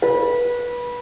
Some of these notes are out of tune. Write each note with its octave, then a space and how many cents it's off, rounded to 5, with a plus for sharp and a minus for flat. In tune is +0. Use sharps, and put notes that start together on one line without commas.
B4 -25